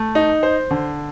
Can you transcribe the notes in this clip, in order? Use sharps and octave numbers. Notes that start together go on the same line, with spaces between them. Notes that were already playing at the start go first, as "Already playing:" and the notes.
Already playing: A3
D#4
C5
D3